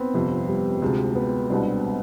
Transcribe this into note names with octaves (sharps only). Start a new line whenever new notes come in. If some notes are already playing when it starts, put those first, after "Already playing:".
Already playing: B3 C4
G1 F2 C3
G3
G3
D2 C3 F3 G#3
B3
C2 B2 G3 C4 D4